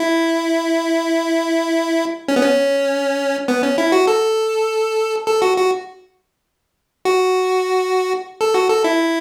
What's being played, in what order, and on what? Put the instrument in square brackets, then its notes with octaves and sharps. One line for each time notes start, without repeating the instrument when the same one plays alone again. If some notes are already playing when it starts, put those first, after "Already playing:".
Already playing: [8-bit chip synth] E4
C#4
B3
C#4
B3
C#4
E4
F#4
A4
A4
F#4
F#4
F#4
A4
F#4
A4
E4